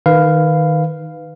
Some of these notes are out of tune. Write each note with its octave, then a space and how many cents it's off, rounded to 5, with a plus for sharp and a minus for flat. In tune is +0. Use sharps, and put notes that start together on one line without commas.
D#3 +0 B4 +15 F5 +0